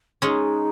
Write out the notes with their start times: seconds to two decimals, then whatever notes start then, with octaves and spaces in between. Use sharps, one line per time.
0.22 G#3 C#4 D#4